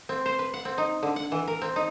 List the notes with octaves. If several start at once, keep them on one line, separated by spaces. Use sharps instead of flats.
C4
C5
B4
F#5
C4
D#4
D3
F#5
E3
A#4
C4
D#4